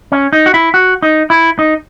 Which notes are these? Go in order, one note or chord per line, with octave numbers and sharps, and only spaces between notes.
C#4
D#4
F#4
E4
F#4
D#4
E4
D#4